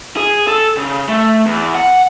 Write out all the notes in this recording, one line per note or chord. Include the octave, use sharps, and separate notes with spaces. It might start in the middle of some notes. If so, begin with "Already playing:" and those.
G#4
A4
C#3
A3
E2
F#5